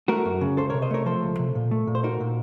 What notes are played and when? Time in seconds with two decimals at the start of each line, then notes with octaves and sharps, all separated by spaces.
0.08 A3 F#4 A#4
0.25 F#2
0.41 C#3
0.57 C#2 A4 C5
0.70 A#4 C#5
0.74 C3
0.82 C5 D#5
0.91 A3 A#4 C#5
1.06 F3 A4 C5
1.23 C#2
1.39 C3
1.55 A#2
1.71 A3
1.87 A#2
1.95 C5
2.04 D#4 F#4 A#4
2.20 A#2